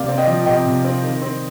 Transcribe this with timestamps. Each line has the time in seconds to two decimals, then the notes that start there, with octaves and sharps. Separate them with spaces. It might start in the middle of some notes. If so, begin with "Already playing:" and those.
Already playing: C3 A#3 D5 F5
0.08 C4
0.17 D#5 G5
0.27 F3
0.46 C3 D#5 G5
0.65 C3
0.84 C4
1.03 D#3
1.22 C4